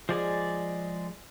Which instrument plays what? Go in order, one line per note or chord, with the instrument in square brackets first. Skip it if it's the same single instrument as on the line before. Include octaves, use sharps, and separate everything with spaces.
[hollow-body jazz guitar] F3 G#4 [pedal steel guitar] G#3 D5